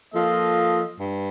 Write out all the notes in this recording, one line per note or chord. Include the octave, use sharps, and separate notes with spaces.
F3 A#3 F4 A4 D#5
G2